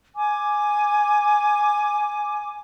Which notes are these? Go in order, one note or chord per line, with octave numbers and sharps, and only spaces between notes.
G#5 D6